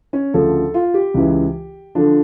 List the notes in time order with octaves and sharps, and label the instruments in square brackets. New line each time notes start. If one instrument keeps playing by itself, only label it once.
[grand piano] C#4
D2 C#3 F3 A4
F4
G4
C#2 C#3 E3
D3 F3 D4